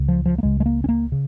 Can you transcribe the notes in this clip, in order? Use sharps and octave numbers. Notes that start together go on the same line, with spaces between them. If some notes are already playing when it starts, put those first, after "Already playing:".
Already playing: C#2 C#3
F3
F3
A#3
C#2 C#3 G#3
G#3
A#3
C#4
A#3
C#3